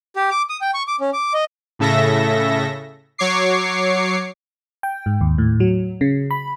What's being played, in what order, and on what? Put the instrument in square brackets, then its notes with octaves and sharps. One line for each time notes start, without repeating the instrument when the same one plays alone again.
[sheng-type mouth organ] G4
D6
D#6
G5
C#6
D6
C#4
D6
D#5
[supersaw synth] A2 C#3 A4 E5 A#6
F#3 C#5 C#6 D6 C7
[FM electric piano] G5
G#2
D#2
A2
F#3
C#3
B5